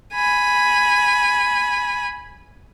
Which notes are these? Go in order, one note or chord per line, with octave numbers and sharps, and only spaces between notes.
G#5 B5